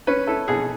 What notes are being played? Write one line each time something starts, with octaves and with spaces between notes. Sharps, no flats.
C#4 B4
E4 A4
B2 G#4